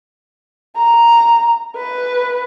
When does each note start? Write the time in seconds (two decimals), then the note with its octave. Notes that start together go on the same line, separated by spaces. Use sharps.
0.77 A#5
1.76 B4